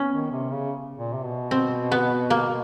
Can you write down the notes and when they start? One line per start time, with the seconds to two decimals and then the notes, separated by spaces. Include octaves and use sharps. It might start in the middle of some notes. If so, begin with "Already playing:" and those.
Already playing: B3 C#4
0.13 D#3
0.32 C3
0.52 C#3
0.98 A#2
1.14 C3
1.25 B2
1.51 C4
1.92 B3
2.30 A#3